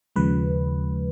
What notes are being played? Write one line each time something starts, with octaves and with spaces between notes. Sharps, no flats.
D#2 C#3 F3 G#3 B4